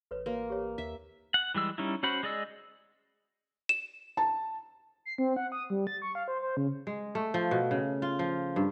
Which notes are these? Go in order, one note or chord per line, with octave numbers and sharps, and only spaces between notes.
A1 A4 B4 C#5
A#3 F#4 B4 C#5
G4 C#5
D#2 E5
F#5
E3 G3 G#3 E6
G3 C#4 D#4 E4
C#4 F#4 C5 F#5 B5
G#3 G#4 D5 D#5 E6
E7
A5
C7
C4
F#5
D#6
G3
A6
C#6
F5
C5
C5
C#3
G#3
A3
F3
B2
C#3
F4
F3
G2